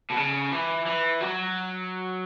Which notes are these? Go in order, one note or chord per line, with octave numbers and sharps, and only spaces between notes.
B2
C#3
E3
E3
F#3